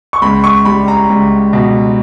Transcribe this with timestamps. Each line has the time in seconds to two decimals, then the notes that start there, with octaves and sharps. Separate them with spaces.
0.13 C#6
0.22 C#2 B5
0.44 C#6
0.65 G3 B5
0.88 A#5
1.10 C#2
1.53 B2